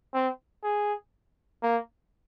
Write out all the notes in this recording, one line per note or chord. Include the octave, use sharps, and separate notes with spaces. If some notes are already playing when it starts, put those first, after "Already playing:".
C4
G#4
A#3